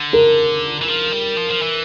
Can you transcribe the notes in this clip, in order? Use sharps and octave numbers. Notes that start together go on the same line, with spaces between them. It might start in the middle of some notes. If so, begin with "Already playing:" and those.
Already playing: D3
A#4
E3
F3
G3
F3
F3
E3